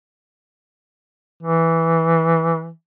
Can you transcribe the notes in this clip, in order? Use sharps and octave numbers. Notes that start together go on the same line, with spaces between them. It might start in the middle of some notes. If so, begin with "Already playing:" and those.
E3